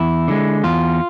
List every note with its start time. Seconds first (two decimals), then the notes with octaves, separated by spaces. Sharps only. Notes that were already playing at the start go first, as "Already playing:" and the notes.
Already playing: E2 E4
0.28 D3 G#3
0.64 E2 F4